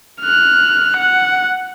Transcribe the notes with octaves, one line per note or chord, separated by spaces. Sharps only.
F6 F#6
F#5